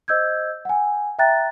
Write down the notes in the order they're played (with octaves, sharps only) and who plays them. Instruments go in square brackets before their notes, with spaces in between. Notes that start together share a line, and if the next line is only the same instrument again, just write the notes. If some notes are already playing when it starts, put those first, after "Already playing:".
[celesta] C5 D#5 E6 G6 G#6
F#5 G#5
E5 G5 A#5 F#6 A6